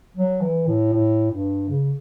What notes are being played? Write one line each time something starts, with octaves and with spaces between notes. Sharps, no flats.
F#3
E3
A2
A2
G2
C#3